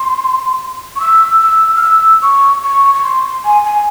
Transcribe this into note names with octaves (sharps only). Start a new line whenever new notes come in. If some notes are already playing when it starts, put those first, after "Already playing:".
Already playing: C6
C#6
E6
E6
F6
E6
C#6
C#6
C#6
C6
G#5
G#5